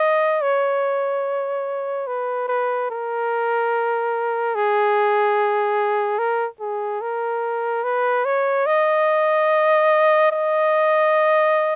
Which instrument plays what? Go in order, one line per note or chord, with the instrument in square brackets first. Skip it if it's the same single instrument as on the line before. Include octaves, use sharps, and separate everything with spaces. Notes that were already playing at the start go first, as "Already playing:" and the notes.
Already playing: [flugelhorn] D#5
C#5
B4
B4
A#4
G#4
A#4
G#4
A#4
B4
C#5
D#5
D#5